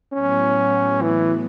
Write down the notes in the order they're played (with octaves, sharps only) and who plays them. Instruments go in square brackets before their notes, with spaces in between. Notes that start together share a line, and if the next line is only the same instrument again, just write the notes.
[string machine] A2 F#3 B3 [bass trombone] C#4
[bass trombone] E3